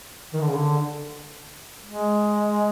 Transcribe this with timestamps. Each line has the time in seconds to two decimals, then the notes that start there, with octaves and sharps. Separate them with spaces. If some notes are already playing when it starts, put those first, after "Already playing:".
0.33 D#3
0.41 D3
0.47 C#3
0.54 D3
1.86 G#3